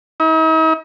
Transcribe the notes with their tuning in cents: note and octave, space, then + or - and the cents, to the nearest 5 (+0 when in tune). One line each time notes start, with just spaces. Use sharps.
D#4 +45